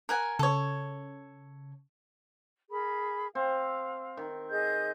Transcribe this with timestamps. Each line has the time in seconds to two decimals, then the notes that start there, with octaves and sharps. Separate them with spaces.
0.09 A#4 F#5 G#5
0.39 C#3 A4 C#5
2.70 G#4 A#4 B5
3.35 C4 F5
4.17 D#3
4.50 G#4 D#5 G6